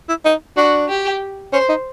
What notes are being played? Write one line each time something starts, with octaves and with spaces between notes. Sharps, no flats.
E4
D#4
D4 F#4
G4
C#4 C5
D#4